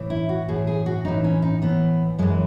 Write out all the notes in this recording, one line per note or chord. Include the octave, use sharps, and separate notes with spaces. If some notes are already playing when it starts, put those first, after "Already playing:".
Already playing: A2 E3
E4
F#4
A2 E3 G#4
G#4
F#4
A2 E3 D#4
C#4
D#4
A2 E3 B3
F#2 E3 G#3